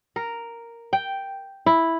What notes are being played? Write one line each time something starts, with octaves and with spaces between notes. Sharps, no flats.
A#4
G5
E4